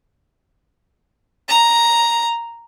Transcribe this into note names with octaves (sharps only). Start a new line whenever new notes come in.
A#5